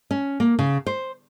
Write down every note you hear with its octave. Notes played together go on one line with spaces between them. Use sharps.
C#4
A#3
C#3
C5